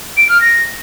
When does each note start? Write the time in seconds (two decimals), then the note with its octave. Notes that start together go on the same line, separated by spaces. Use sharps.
0.17 D7
0.29 F6
0.41 A#6